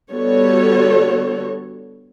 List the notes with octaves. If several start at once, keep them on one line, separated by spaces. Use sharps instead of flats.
D3 G3 B3 F#4 A4 C#5